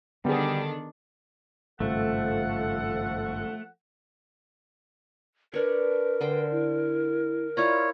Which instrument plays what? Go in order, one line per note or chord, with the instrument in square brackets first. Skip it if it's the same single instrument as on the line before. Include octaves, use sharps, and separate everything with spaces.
[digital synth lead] D3 [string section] D#3 D4 [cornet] G3 [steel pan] B3 G#4
[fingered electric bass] G#1 G2 C#3 [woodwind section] F3 A4 F#5 [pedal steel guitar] A3
[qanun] D4 C#5 [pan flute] A#4 [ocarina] B4
[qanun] D3 C5 G5
[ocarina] E4
[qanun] E4 F4 A#5 [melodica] C#5 [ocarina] D5